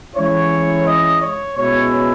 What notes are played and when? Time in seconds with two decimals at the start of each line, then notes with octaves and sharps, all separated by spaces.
0.15 E3 G#3 C#4 E4 C#5
0.86 D#5
1.22 C#5
1.57 B2 G#3 C#4 E4 C#5